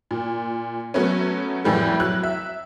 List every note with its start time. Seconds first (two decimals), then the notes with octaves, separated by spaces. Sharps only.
0.11 A#2
0.94 F#3 A3 B3 C#4
1.64 F2 A2 E3 G3 G#3
2.00 F#3 F#6
2.23 E5